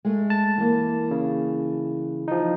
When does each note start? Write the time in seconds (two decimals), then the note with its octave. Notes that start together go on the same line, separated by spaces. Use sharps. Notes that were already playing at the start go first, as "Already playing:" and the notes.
0.05 G#3 A3
0.30 A5
0.58 E3 A#3
1.11 C#3
2.28 F3 D#4